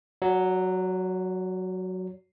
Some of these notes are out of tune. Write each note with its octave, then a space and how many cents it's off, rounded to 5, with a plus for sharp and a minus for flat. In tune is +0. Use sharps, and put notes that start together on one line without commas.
F#3 +0 D5 -40